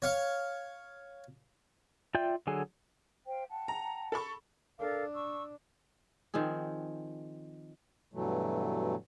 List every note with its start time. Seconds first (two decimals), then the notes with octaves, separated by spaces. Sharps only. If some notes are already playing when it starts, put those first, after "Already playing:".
0.02 C#5 F5 C#6
2.15 F4 D5 E5 G5 G6
2.47 D3 F#3 G#4 A4 G#5
3.26 C5 F5 G5
3.49 F#5 G5 A5
3.68 A#5
4.12 A4 B5 C#6
4.79 D4 A4 A#4 F5
5.14 C#6 E6
6.34 D#3 F3 C4 G#4
8.13 G2 B2 E3 F#3 A3